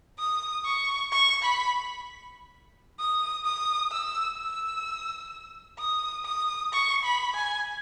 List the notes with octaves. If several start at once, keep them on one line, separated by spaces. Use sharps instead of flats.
D#6
C#6
C#6
B5
D#6
D#6
E6
E6
D#6
D#6
C#6
B5
G#5